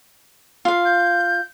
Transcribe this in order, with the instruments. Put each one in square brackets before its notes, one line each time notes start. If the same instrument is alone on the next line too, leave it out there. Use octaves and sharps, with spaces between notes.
[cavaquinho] F4 F5
[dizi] G6